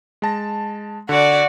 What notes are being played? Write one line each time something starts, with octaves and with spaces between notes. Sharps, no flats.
G#3 A5 A#6
D3 F#4 D5